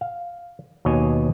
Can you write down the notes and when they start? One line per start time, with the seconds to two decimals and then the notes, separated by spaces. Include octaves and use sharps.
0.01 F5
0.85 D#2 B2 C#5 D#5 G#5